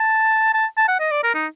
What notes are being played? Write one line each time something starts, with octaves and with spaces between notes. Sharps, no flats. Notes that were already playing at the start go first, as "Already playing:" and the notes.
Already playing: A5
A5
A5
F#5
D#5
D5
A#4
D#4